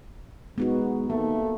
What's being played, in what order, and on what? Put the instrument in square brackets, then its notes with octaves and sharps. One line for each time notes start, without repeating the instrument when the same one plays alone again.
[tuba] G#3 [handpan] B3 D#4 F#4
[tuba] D#2 [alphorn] A3 [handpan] A#3